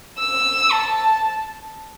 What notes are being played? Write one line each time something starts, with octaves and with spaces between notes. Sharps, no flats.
E6
A5